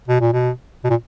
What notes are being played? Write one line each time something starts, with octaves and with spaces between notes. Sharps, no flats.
B2
A#2
B2
B2
A#2